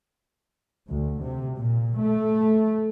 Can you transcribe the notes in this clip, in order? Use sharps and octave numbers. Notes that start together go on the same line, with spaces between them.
D2
C3
A#2
A3